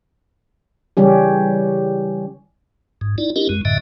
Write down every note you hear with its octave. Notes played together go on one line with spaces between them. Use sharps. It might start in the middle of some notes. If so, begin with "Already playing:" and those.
C#3 E3 G3 C#4 G4
G#2
D#4 E4 D5
C#4 D4 E4 G4 A#4 D#5
F#2 G#3
F#2 A2 D3 D#5 E5